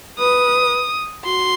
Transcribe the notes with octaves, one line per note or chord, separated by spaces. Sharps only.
B4 D#6
F#4 C6